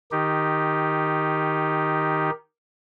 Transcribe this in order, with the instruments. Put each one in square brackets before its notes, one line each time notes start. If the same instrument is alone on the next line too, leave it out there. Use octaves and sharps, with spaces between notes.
[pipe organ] D#3 D#4 G4